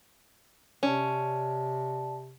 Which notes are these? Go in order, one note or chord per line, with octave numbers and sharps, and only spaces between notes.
C3 C#4 D5 A5